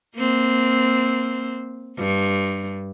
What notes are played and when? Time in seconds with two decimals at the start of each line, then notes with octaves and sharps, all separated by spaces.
0.17 A#3 C4
1.98 G2